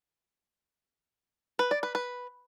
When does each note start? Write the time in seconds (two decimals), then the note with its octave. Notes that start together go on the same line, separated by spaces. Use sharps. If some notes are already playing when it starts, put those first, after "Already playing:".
1.59 B4
1.71 D5
1.83 B4
1.95 B4